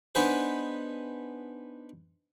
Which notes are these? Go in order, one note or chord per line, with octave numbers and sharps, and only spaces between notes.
B3 D4 D#4 G#4 B4 C5